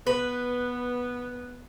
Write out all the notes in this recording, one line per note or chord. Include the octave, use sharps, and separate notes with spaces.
B3 B4